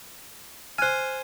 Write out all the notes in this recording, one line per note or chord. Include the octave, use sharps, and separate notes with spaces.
C5 G#5 F6 F#6